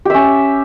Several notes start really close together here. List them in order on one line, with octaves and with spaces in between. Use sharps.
G4 E5 C#4